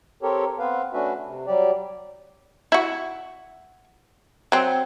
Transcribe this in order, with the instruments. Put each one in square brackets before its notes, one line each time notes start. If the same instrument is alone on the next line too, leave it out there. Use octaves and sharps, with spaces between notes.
[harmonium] C4 G4 A4 A#4 C#5
B3 C4 B4 F5
A3 C#4 D4 F#4 B4 E5
C3
F#3 G3 G4 D5
[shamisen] E4 F#4
F#3 C4